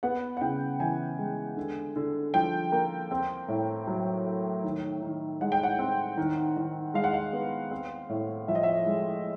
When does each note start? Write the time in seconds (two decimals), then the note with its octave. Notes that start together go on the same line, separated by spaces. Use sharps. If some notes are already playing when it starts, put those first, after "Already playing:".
0.03 B3 F#5
0.37 F#5
0.41 C#3 G5
0.80 E3 G#5
1.19 G#3
1.57 D3
1.96 D3
2.34 F3 G5
2.72 A#3
3.11 C4
3.48 A2
3.87 F#3
4.26 A3
4.64 D#3
5.02 D#3
5.41 G#3 F#5
5.52 G5
5.63 F#5
5.79 C4
6.17 D#3
6.57 D#3
6.94 G#3 F5
7.04 F#5
7.14 F5
7.33 B3
7.71 C4
8.09 A2
8.48 F3 E5
8.55 D#5
8.63 E5
8.86 G#3